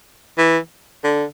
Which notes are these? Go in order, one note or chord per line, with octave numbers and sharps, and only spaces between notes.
E3
D3